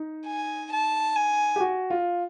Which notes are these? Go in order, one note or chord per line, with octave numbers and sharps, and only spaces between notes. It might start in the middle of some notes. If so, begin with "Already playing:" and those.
Already playing: D#4
G#5
A5
G#5
G4
F#4
F4